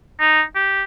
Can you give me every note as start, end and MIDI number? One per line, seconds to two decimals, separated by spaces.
0.20 0.42 63
0.55 0.83 67